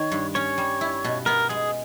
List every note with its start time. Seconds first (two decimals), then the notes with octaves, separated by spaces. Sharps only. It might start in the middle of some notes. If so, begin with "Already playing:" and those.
Already playing: D#3 C#5
0.12 G2
0.35 C#4 C#5
0.58 G3
0.81 E4
1.04 B2
1.26 B3 A#4
1.49 G#3 G#4